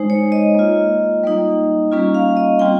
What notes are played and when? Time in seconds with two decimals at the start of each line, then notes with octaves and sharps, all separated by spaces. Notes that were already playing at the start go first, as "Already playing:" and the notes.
Already playing: G#3 D#4 C5
0.10 C#5
0.32 D#5
0.55 A#3 F4
1.23 G3 A#3 D#4
1.92 G3 A#3 C#4 F4
2.15 F5
2.37 D#5
2.59 G3 C4 F4 G5